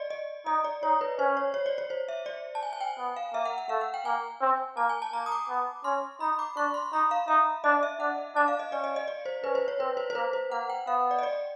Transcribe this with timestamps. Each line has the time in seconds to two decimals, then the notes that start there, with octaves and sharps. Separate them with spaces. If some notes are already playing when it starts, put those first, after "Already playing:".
Already playing: D5 D#5
0.10 D#5
0.46 D#4 D#5
0.64 D5
0.83 D#4 C#5
1.01 B4
1.19 C#4 C5
1.37 C#5
1.54 C#5
1.66 D5
1.78 C#5
1.90 C5
2.08 E5
2.26 D5
2.55 A5
2.63 G#5
2.73 G#5
2.81 G5
2.98 B3
3.16 F5
3.34 A#3 E5
3.45 F#5
3.58 F#5
3.69 A3 F5
3.81 F#5
3.94 G5
4.05 A#3 G#5
4.41 C4
4.77 A#3 A5
4.89 G#5
5.02 A5
5.13 A#3 A#5
5.26 D#6
5.32 D6
5.49 B3
5.84 C#4 C6
6.20 D#4 B5
6.39 D6
6.56 D4 C#6
6.74 C6
6.93 D#4 B5
7.11 F5
7.28 D#4 E5
7.64 D4 D#5
7.83 E5
8.00 D4 F#5
8.36 D4 A5
8.48 F5
8.59 D#5
8.72 C#4 D5
8.84 D#5
8.96 D#5
9.08 D5
9.26 C5
9.44 C#4 B4
9.55 C5
9.68 C#5
9.80 C4 B4
9.97 C5
10.10 C5
10.15 A#3 B4
10.33 C5
10.51 A#3 F#5
10.70 G5
10.87 B3 F5
11.11 D5
11.19 D#5
11.23 D5